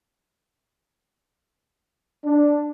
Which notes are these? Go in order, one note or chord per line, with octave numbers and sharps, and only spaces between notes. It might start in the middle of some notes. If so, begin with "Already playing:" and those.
D4